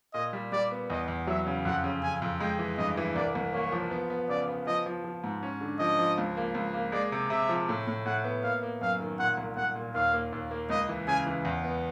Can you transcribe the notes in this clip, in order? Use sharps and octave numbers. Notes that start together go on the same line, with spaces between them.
A#2 D#5
G3
G3 D5
B3
E2 D#5
E2
F#3 E5
C#3
F2 F#5
C#3
C#3 G#5
F2
G#3 G5
E3
G2 D#5
E3
C2 D5
C2
A#3 C#5
F3
B3
B3
C#3 D5
B3
F3 D#5
F3
F3
G#2
C#4
D3
F3 D#5
F3
C#2
A#3
C#2
A#3
G#3 D5
C3
C3 E5
F3
A2
A2
A2 F#5
B3
A#3 F5
A#3
F#2 F5
D#3
A#2 F#5
C2
C2 F#5
A#2
D#2 F5
A#3
D#2
A#3
C#2 D#5
E3
C#3 G#5
E3
E2
B3